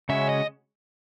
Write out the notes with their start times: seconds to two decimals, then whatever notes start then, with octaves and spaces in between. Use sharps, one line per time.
0.09 C#3 G#3 C#4 F#4 E5
0.29 D#5